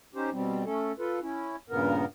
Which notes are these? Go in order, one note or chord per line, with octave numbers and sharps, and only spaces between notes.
C#4 D#4 G4 C5
B2 G3 C4
A3 C#4 A4
F4 A4 B4
C#4 E4
G2 A#2 C#3 B3 A#4